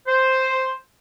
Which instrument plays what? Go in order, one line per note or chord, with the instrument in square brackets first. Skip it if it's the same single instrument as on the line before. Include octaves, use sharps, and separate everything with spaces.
[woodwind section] C5